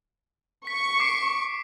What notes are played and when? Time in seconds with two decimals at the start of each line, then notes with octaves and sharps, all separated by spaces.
0.67 C#6 B6
1.00 D6 C7 D7